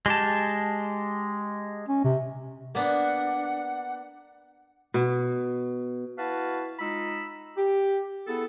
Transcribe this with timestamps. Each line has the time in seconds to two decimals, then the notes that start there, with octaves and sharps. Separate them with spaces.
0.06 G#3 G4 A5
1.88 C#4
2.04 C3
2.75 A#3 B3 D4 F#5
4.94 B2
6.18 E4 F#4 B4 F5 A5
6.79 G#3 D#4 F4 B5 E6
7.57 G4
8.27 B3 E4 G#4 A4